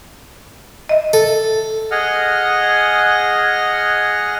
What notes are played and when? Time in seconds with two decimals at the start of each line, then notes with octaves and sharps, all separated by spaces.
0.89 D#5 E5
1.13 A4
1.91 G#4 D#5 F#5 F6